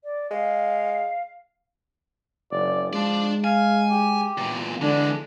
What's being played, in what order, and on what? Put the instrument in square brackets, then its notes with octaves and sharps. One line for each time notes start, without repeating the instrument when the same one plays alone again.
[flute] D5
[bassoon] G#3 [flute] F5
[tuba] F#1 [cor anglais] D5
[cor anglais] F3 [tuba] G#3 [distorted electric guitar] D4 D5
[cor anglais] F5 [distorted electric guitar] G#5
[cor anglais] G4
[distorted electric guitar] E2 A#2
[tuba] D3 [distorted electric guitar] E3 G#3 [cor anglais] D4